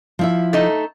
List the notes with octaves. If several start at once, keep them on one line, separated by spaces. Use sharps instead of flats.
F3 E4 E5
A3 D#4 A4